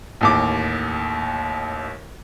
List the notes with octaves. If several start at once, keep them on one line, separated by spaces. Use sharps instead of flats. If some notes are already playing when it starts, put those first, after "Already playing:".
A1 D#2 D6